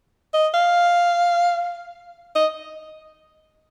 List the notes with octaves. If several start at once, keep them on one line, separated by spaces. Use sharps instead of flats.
D#5
F5
D#5